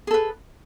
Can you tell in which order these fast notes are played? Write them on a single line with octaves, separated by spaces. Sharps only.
G#4 A4 B4